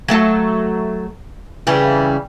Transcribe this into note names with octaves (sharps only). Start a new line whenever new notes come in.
F#3 A3 A4
C#3 E3 G3